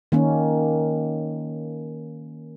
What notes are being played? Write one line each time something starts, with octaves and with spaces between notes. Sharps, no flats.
D#3 A#3 C#4